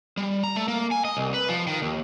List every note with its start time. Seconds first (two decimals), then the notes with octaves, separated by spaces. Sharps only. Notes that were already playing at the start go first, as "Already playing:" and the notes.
0.17 G3
0.44 A#5
0.56 A3
0.68 A#3
0.91 G#5
1.05 D#5
1.17 C2
1.34 B4
1.49 F3
1.67 D#3
1.82 D#2